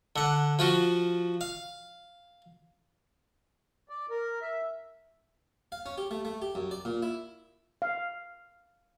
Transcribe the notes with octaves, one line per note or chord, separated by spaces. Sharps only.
D3 F#5
F3 F4 F#4
F5
D5
A#4
E5
F5
C#4
G4
A3
A3
G4
F#2
D5
A#2
E4
F5